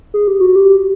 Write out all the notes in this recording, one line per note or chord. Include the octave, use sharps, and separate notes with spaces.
G#4
G4
F#4
G4